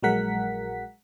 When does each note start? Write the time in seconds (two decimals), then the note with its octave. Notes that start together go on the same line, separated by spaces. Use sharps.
0.03 A#1 F#3 G#3 A#4 F#5 B6